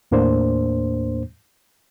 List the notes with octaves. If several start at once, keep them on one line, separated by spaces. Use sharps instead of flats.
D#2 A2 A#3 D4 C5